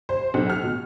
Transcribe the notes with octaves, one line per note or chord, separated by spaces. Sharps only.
C5
B1
F6
B2